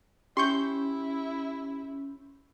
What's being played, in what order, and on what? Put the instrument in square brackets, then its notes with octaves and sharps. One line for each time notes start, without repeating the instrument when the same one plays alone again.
[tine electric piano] C#4 [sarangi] E4 [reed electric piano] G4 [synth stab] C6 C#6 G6